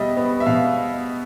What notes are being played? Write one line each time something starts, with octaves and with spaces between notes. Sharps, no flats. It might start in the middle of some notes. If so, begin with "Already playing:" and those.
Already playing: B2 G3 D#5 E5
B3
E5
B2 F5